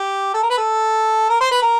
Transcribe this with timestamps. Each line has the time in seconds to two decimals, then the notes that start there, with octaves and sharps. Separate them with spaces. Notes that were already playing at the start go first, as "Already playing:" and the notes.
Already playing: G4
0.34 A4
0.43 A#4
0.50 B4
0.58 A4
1.30 A#4
1.41 C5
1.51 B4
1.62 A#4